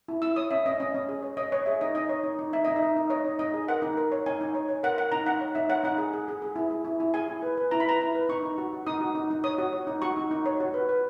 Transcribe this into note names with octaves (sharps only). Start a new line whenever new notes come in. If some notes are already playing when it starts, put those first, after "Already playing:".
E4
E4 E6
C#5 D#6
C#4 E5
C#4 D#5
C#4 D#5
C#4
G#4
C#5
C#5 D#5
C#5
G#4 E5
D#4 D#5
D#4 D#5
C#5
D#4
D#4
D#4 E5
D#4 D#5
E5
D#4
D#4
C#5 D#5
D#4
D#4 D#5
G#4
A#4 F#5
D#4
A#4
C#5
D#4 G#5
D#4
C#5
C#5
A#4 F#5
A#4 F#5
D#4 A#5
D#4 F#5
C#5
D#4 E5
C#5 F#5
D#4 F#5
G#4
G#4
G#4
G#4
E4
G#4
E4
E4
G#4 G#5
E4
B4
B4
E4 A#5
B5
B4 A#5
E4
B4
D#4 C#6
D#4
F#4
F#4
D#4 D#6
F#4
D#4
D#4
C#5 D#6
F#4
C#5
D#4
F#4 C#6
D#4
D#4
C#5
F#4
B4
B4